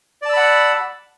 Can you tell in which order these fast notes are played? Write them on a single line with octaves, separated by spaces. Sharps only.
D5 A5 E6 B5 F#5